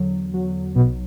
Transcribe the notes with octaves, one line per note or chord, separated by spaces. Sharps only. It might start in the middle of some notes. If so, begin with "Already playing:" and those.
Already playing: E2 D3 F#3
F#3
B1 B2